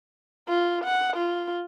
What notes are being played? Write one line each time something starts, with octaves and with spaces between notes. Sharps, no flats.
F4
F#5
F4